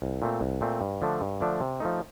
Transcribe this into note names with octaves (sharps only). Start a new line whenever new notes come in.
C2
A#2 A3 C4
C2
A#2 A3 C4
G2
D3 F3 A3 D4
G2
D3 F3 A3 D4
C3
F3 A3 D#4